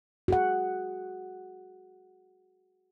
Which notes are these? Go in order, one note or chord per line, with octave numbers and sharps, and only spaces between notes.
F#4 G#4 F#5